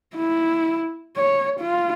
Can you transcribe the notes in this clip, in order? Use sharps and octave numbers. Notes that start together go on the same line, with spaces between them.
E4
C#5
F4